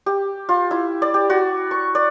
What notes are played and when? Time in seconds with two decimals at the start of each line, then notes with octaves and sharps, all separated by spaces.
0.06 G4
0.49 F4
0.71 E4
1.02 D5
1.14 G4
1.30 F#4
1.71 C#6
1.95 D5